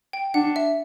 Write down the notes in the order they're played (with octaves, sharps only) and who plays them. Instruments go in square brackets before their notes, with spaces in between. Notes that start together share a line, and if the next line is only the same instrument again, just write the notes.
[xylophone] G5
[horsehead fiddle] D4 [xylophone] F#5
[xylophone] E5